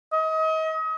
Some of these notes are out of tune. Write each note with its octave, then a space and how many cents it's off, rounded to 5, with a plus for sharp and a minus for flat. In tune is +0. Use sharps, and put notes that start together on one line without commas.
D#5 +35